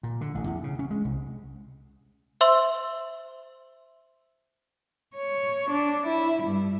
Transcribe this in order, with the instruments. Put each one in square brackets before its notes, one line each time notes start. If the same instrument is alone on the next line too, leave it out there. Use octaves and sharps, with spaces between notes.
[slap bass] A#2
D3
A1
E2
C#3
C#4
G#3
C2
[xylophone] C5 E5 C6 E6 F#7
[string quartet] C#5
D4
E4
G2